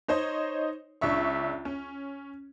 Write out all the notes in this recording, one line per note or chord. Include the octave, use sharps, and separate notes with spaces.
D#4 C5 C#5 D#5
C#2 D4 E5 C#6
C#4